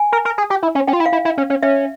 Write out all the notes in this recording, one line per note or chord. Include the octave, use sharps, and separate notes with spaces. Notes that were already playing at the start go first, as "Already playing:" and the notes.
Already playing: G#5
A#4
A#4
G#4
G4
E4
C#4
C#4 G5
F4
E4
F5
E4
E4
C#4
C#4
C#4 E5